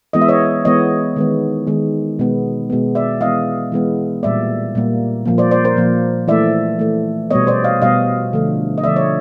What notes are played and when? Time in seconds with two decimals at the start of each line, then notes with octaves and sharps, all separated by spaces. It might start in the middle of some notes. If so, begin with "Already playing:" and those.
0.13 E3 G#3 B3 D#5
0.21 E5
0.29 C#5 D#5
0.65 E3 G#3 B3 C#5 D#5
1.16 D#3 G#3 B3
1.67 D#3 G#3 B3
2.19 B2 G#3 B3
2.70 B2 G#3 B3
2.95 D5 E5
3.21 E3 G#3 B3 D#5 F5
3.72 E3 G#3 B3
4.23 A#2 G3 A#3 D5 E5
4.75 A#2 G3 A#3
5.25 A#2 F3 A#3
5.38 C5 D5
5.51 C5 D5
5.65 A#4 C5
5.77 A#2 F3 A#3
6.28 E3 A3 D5 E5
6.79 E3 A3
7.31 B2 G3 B3 C#5 D#5
7.47 C5 D5
7.64 D#5 F5
7.82 B2 G3 B3 D#5 F5
8.33 D3 F3 A3
8.78 D#5
8.84 D3 F3 A3 D5 E5
8.96 C#5 D#5